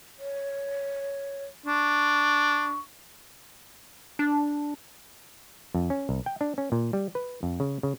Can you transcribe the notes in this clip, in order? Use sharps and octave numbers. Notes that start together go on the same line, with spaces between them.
C#5
D4 C#6
D4
F2
C#4
C2
G5
D4
C#4
A#2
G3
B4
F2
C#3
C#3